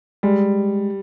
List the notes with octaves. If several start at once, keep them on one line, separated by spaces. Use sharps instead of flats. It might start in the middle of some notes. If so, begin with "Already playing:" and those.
G3 G#3